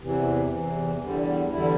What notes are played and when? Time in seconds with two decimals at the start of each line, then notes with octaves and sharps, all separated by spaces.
0.01 E2 C3 E3
0.51 E2 C3 E3
1.01 E2 D3 G3
1.51 E2 D3 G3 E4